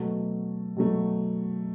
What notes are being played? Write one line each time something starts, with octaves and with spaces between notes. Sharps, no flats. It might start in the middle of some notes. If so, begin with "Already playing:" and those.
Already playing: B2 F#3 A3
B2 F#3 A3